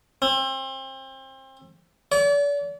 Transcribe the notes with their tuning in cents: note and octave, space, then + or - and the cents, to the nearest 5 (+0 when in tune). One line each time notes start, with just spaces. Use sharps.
C4 +30
D5 -40